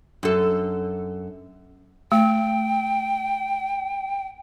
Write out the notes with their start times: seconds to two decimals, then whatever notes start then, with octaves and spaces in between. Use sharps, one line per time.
0.23 F#2 A4
2.12 A3 G5